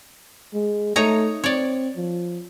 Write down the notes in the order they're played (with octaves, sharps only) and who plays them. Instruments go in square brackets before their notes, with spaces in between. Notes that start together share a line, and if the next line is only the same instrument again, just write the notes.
[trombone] G#3
[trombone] A3 [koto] D#4 C#5 A#5
[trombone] C4 [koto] C#5 D5
[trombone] F3